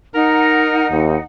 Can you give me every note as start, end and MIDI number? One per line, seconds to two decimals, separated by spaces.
0.14 1.21 63
0.14 0.88 70
0.14 1.21 78
0.14 0.88 82
0.91 1.16 39